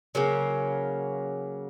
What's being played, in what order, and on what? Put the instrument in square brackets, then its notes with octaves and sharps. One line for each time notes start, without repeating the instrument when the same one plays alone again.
[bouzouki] C#3 F#3 A#3